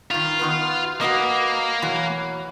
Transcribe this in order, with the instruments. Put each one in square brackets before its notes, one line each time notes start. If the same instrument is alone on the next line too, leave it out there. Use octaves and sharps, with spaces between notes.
[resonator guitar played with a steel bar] G2 D#3 [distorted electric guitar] F4
[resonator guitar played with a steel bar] D#3 B3 B4
[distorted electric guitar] A#3 [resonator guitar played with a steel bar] F#4 B4 D#5
[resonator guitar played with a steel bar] B2 E3 F#3